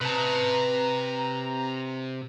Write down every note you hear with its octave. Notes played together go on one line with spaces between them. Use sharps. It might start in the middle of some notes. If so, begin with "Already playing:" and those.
C3 B4 A5 A#5